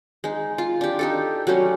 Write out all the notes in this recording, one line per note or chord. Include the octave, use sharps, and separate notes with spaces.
G#3 D#4
F4
D4 G4
D#4 G4 A4
F#3 G3 A3 C#4